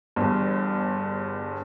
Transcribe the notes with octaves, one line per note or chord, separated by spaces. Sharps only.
G1 E2 G2